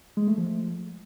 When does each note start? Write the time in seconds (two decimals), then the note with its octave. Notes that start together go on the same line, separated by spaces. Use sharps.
0.17 G#3
0.27 A3
0.38 F3